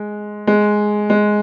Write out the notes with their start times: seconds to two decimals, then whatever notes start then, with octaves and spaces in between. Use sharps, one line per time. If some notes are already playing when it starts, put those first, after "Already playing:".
Already playing: G#3
0.47 G#3
1.10 G#3